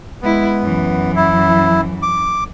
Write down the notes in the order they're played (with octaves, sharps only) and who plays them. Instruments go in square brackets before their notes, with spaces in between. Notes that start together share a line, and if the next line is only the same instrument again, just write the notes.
[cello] G#3 E4 [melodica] B3
[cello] F#2 E3
[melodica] E4
D6